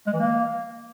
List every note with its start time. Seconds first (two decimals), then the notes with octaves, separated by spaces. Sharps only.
0.07 G#3
0.13 E3
0.20 A#3